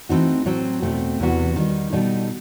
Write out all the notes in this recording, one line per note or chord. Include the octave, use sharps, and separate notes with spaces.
E3 A3 C4 D#4 F#4
A2 F#3 C4 F#4
E2 B2 A3 C4
E2 C3 E3 B3 F#4
D#3 G3 D#4
B2 G3 D#4 A4